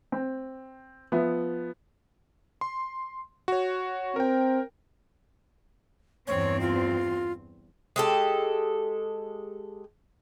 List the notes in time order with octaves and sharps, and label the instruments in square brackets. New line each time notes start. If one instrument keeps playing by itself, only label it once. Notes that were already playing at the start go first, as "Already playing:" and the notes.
[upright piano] C4
F3 B3 E5
[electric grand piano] C6
F#4 C#5
[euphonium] C4 [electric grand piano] A#4 G5
[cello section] E2 G2 C4 [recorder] C#5
[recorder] F4
[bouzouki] G#3 G4 A4